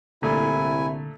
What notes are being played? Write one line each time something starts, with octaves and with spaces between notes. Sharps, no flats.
C2 A#2 D3 A3 E4 G#5